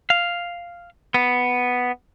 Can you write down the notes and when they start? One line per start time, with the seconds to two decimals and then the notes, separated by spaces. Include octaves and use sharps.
0.10 F5
1.14 B3